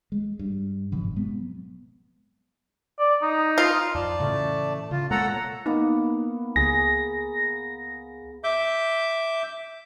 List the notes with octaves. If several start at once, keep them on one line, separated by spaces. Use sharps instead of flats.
G#3
G2
F#1 G#2 B2 F3
F#3 G#3 B3 C4
D5
D#4
F4
F2 D5 A5
A2 C#3 E3 A3
C#3 F4
B2 G#3 A#3 A4 C#5 F#5 A#5
A#3 B3 D#4
C#2 G#4 A#6
E5 D6 G6